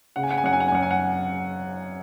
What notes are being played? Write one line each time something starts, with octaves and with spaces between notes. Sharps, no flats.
C#3 F#5
G#5
F#5
G#5
F#2 F#5
G#5
F#5
G#5
F#2 F#5
G#5
F#5